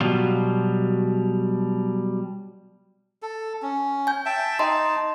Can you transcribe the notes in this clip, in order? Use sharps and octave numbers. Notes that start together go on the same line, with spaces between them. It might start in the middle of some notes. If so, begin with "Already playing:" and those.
B2 F#3 G3 F4
A4
C#4
G#5 G6
E5 G5 A5
D#4 D#5 A5 A#5 C6